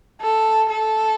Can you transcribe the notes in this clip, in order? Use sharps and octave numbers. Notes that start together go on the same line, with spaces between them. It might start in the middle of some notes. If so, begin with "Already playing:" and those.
A4
A4